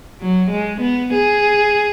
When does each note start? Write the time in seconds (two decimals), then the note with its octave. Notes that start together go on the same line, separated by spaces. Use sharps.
0.20 F#3
0.51 G#3
0.82 B3
1.13 G#4